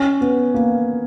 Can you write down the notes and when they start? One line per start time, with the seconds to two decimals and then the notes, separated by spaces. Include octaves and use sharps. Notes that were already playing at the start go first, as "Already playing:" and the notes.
Already playing: C#4
0.21 B3
0.54 A#3